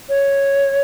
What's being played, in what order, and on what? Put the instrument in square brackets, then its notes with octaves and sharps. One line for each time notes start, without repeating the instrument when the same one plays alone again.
[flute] C#5